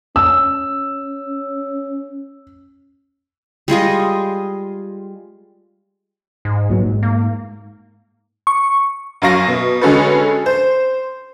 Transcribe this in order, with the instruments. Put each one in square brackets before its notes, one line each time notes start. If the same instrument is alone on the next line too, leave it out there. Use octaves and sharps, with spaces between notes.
[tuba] C#4 [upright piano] E6
[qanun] G3 G#3 F4 D#5
[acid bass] G#2
[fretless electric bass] A#2 F#3 B3
G#2
[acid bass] A#3
[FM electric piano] C#6
[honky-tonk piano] F#2 F#3 F5 C#6 A#6
B2
D3 G#3 C#4 F#4 A4 B4
C5